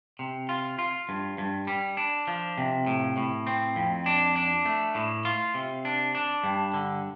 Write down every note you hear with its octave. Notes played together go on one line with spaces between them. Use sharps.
C3
F4
F4
G2
G2
G3
D4
F3
C3
A2
A2
C4
F2
D4
D4
A3
A2
F4
C3
D4
D4
G2
D3